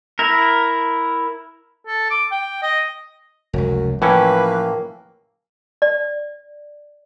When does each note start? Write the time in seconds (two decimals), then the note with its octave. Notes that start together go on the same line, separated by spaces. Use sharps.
0.19 E4 A#4
1.87 A4
2.11 D6
2.31 G5
2.62 D#5
3.53 F1 C#2 F#2
4.02 A2 E3 F3 A#3 C#4 B4
5.82 D5